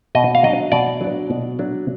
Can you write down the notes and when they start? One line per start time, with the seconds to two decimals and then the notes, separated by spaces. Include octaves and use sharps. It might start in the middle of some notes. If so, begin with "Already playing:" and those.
0.15 B2 D#5
0.35 F5
0.43 F#3 D4 D#5
0.72 B2 D5
1.01 F#3 D4
1.30 B2
1.59 F#3 D4